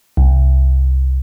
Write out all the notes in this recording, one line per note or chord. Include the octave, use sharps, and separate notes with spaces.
C2